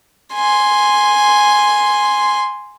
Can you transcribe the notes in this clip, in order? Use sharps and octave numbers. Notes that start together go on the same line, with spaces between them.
G#5 C6